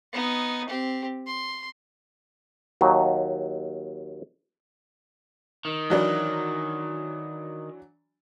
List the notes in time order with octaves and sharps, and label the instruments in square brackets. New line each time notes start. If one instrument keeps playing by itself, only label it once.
[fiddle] B3 D#4
C4 G4
C6
[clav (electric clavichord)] D#2 F#3 D#4
[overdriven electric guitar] D#3
[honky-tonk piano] E3 F#3 D4